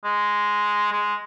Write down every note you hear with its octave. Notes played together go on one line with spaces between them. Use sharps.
G#3
G#3